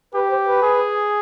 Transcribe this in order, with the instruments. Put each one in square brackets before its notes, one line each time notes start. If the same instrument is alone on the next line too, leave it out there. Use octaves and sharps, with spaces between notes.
[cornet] G4 [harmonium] B4
[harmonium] C5
B4
[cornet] G#4